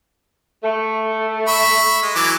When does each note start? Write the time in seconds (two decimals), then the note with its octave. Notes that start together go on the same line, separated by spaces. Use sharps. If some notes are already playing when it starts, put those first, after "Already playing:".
0.64 A3
1.48 E5 B5 C#6
2.02 G#3
2.16 E3 F#3 D6